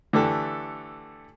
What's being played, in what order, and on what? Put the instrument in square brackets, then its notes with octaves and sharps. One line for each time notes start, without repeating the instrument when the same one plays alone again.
[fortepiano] D3 E3 A3 G4 A4